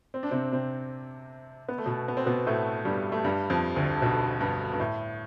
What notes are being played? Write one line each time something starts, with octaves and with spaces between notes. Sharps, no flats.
C4
D4
C3 C4
C3 C4
B3
A3
B2 B3
B3
C4
B2 B3
A2 A3
G2 G3
A3
G2 G3
F2 F3
D2 D3
B1 B2
G2
G2
A2